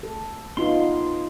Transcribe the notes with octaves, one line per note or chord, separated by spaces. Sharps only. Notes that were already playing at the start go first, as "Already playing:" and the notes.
A4
B3 D#4 F4 C6